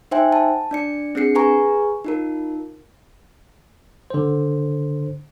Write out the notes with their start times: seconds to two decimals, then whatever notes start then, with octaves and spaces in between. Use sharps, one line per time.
0.11 D#4 C5 E5 G5 G#5
0.32 A5
0.71 D4 D5 C#7
1.15 C4 D4 G#4 C7 C#7
1.35 G#4 B4 G#5 A#5 C#6
2.04 D#4 F4 A#4
4.10 D3 C5